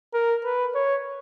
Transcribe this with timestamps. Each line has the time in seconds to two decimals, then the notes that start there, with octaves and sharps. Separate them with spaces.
0.14 A#4
0.45 B4
0.75 C#5